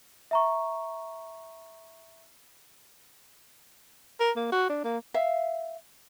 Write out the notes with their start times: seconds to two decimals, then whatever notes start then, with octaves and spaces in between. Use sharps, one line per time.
0.31 E5 A#5 C#6
4.20 A#4
4.36 A#3
4.52 F#4
4.69 D4
4.84 A#3
5.14 E5 F5